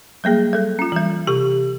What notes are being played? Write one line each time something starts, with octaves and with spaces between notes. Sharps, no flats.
F#3 G3 A#3 G#4
G3 A4
C#4 F4
E3 G3
C3 G4